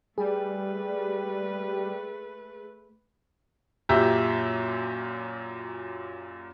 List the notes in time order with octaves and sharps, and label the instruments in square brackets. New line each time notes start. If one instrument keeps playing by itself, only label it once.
[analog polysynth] G3 [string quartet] A3 B4 [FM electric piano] G#4
[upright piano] F#2 A#2 G4 E5 A#5